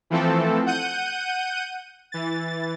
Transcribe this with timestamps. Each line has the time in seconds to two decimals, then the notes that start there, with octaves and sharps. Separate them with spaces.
0.10 E3 F3 A3 C4 A4
0.66 F#5 G6 D#7
2.12 E3 A6